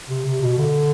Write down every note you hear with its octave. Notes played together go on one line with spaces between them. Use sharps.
C3
C3
B2
D3